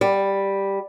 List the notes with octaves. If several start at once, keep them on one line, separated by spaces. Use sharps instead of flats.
G3